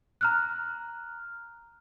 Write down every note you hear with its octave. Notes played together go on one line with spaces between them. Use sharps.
A#5 F6 F#6